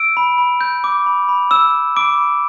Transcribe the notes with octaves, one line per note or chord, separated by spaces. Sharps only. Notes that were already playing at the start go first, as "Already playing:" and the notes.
Already playing: E6 D7
B5
B5
G6
D6
B5
B5
E6 G6 E7
D6
B5 D6 D7
B5